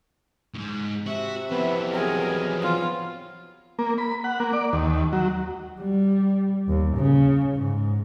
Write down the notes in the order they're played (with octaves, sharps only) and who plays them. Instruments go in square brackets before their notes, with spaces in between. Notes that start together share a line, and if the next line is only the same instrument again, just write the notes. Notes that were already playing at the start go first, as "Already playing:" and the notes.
[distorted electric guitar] D#2 G#2
[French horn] C3 [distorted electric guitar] F#4 [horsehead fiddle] E5
[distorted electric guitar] F2 E3 [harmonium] B3 C4 B4
[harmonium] F#3 B3 C4 [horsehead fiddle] G#4 A#4
[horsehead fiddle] F4
[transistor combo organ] A#3
B5
F#5
A#3
D5
D#2
F#3
[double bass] G3
D#2
C#3
G#2